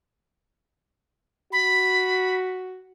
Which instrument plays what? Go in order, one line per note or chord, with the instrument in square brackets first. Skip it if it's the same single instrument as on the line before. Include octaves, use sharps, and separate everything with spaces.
[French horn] F#4 [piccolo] B5